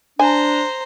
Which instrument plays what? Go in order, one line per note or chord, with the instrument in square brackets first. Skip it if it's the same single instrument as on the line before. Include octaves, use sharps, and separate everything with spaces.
[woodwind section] D4 [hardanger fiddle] C5 A#5 [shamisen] G#5